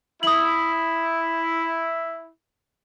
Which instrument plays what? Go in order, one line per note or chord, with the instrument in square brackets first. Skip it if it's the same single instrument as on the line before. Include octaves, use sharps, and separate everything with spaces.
[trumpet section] E4 [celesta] D#6 F#7